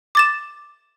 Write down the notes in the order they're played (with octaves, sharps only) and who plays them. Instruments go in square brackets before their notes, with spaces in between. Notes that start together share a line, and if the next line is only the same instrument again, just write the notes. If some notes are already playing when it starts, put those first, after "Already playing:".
[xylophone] D6 A6 E7